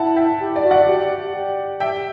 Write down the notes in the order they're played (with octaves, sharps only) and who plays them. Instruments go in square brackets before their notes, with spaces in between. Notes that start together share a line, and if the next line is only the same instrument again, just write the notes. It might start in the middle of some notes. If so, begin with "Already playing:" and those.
Already playing: [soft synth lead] E4 [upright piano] F#5 A5
[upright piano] E5 G5
[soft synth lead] G4
[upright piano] D5
[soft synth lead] F#4
[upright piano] D5 F#5
[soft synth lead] G4
G4
[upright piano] E5 G5